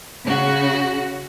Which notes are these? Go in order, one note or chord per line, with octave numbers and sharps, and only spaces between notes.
C#3 F#4